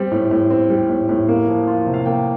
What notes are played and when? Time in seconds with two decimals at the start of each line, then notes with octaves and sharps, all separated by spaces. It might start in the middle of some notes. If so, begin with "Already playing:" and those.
Already playing: G3 C4
0.12 A2
0.31 A2
0.51 C4
0.70 G3
0.90 A2
1.09 A2
1.28 A#3
1.48 F3
1.68 F4
1.87 C3
1.94 F5
2.05 A#3 G5